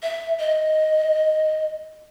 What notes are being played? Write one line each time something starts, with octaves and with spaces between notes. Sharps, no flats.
E5
D#5